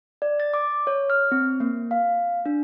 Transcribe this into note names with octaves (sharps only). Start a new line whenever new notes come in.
D5
A6
D6
C#5
F6
C4
A#3
F5
D4